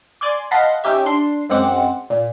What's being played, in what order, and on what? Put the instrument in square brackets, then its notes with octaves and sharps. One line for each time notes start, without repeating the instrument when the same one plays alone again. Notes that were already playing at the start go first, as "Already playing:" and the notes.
[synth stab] D5 G#5 C6 D6
D#5 F5 F#5 A5 B5 C6
C#4 D#4 G4 E5
D4 C6 C7
F#2 G#3 C4 F#5 D6 C#7
A#2